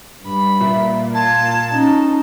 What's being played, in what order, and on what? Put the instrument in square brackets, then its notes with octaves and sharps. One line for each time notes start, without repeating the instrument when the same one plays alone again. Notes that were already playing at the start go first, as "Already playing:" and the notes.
[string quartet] G2 B5
[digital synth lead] A#2 [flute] E5
[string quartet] F4 [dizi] A5 [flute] G#6
[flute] C#4 [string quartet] D#4